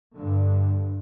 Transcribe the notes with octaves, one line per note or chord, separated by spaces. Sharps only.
G2 D3